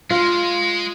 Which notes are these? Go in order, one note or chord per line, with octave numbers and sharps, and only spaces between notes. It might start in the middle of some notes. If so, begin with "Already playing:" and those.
G#3 F4